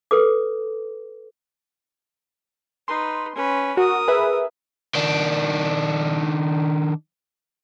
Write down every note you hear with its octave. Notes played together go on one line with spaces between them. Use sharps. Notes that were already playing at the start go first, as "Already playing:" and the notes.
A4 B4 D6
D#4 B4 C6
C#4 B4
F#4 A#4 D#6
G#4 B4 E5
D#3 D4